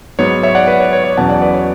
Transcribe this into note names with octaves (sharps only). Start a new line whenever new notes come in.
G#2 F#3 B3 C#5
C#5 E5
D5 F#5
B4
C#5
C#5
C#5
E2 B2 F#3 C#4 F#5 A5
D5 F#5
B4 D5
C#5